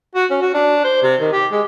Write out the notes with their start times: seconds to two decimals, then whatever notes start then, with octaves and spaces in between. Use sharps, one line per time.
0.15 F#4
0.31 C#4
0.42 F#4
0.54 D4
0.84 C5
1.02 C3
1.20 D#3
1.33 G4
1.52 G#3